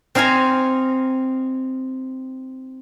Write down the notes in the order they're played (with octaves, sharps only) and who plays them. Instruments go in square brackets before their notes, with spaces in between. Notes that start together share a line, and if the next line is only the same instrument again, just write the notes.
[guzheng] C4 D#4 F5 G#5 A#5